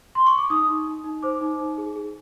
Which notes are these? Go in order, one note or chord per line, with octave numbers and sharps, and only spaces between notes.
C6
C#6
D6
D#4 D#6
D#4
D#4
D#4
C5 D6
D#4
D#4
G#4
G#4